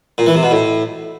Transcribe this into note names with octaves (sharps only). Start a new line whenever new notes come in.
A#2
E3
C3
B2
A2